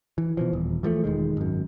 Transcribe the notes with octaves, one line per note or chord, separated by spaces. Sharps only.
E3
B2 E3 F3
D#1 E2
E3 F3 G#3 A3
E1 D#3 G#3
G#1 F#2